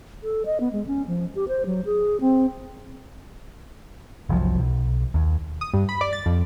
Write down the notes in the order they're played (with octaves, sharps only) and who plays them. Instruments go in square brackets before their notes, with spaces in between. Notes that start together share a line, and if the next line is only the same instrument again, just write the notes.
[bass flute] A4
D#5
B3
G#3
C#4
F3
G4
C5
F#3
G#4
C4
[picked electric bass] F#1 C2 F3 F#3
B1
D#2
[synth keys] D#6
G2
B5
D5
A6
F2